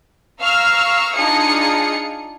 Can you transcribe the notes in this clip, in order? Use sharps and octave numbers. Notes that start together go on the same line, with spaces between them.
F5 A#5 C#6 E6 F6
D4 D#4 F4 G#4 D#6 C#7